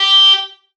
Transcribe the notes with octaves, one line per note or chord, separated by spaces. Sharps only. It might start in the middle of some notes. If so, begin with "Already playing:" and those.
Already playing: G4